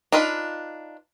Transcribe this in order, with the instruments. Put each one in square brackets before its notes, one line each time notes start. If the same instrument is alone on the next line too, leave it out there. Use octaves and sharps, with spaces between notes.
[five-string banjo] D4 D#4 F4 B4